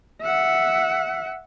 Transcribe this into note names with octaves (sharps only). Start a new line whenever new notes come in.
E5 F#5